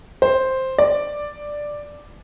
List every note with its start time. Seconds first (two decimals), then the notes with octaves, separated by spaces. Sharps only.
0.22 C5
0.78 D5